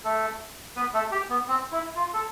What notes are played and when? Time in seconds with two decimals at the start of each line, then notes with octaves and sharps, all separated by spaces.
0.04 A3 A4
0.76 B3 B4
0.94 A3 A4
1.12 G4
1.30 B3
1.48 C4
1.72 E4
1.96 F4
2.14 A4